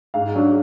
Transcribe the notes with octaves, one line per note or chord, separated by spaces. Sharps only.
G#2 F5
F#3 D4